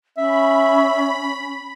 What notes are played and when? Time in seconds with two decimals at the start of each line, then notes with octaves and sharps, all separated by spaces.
0.17 C#4 E5 B5